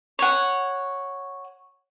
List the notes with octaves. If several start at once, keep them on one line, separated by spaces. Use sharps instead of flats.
C#5 F#5